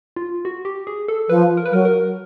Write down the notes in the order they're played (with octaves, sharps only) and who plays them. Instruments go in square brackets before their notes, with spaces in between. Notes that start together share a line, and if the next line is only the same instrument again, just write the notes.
[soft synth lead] F4
F#4
G4
G#4
A4
[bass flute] F3 [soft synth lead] B4
[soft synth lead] A#4
B4
[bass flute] F#3 [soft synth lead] A#4
[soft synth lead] A#4